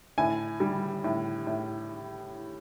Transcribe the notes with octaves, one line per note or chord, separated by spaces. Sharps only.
A2 G#5
G3
A2
A2